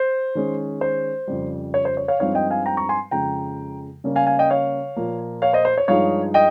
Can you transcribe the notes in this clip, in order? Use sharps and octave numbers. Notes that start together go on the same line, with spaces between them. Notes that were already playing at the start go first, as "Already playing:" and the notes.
Already playing: C5
D#3 G#3 C#4
C5
F2 C#3 G3
C#5
C5
C#5
C#5 F5
G2 F3 G#3 C4 D#4 C#5 F5
D#5 G5
F5 G#5
G5 A#5
A#5 C#6
G#5 C6
F2 C#3 G#3 G5 A#5
C#3 G3 A#3 C#4
F5 G#5
F5 G#5
D#5 G5
C#5 F5
A#2 F3 A#3
C#5 F5
C5 D#5
C5
C#5
G2 F3 G#3 D#4 C#5 F5
D#5 G5